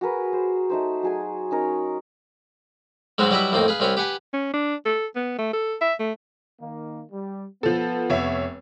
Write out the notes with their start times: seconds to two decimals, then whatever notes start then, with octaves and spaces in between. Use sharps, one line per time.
0.01 F#4 G#4 A#4 B4
0.33 G#4 C5
0.70 A3 D#4 C5
1.03 F#3 G#4 G#5
1.51 C#4 D#4 A#4 C#5
3.18 G#2 F#3 G#3 B3 C4 F#4
3.31 F#3 G3 E4 B4 D#5 E5
3.52 F2 A2 A#3 C4 D#4
3.68 G#4 B4 F5
3.80 C2 C4 C#4 B4 C#5
3.97 G4 B4 F#5 G#5
4.33 C#4
4.54 D4
4.85 A4
5.16 B3
5.38 A3
5.53 A4
5.81 E5
5.99 A3
6.60 D#3 A#3
7.12 G3
7.63 F3 B3 A4
8.10 F1 C#5 E5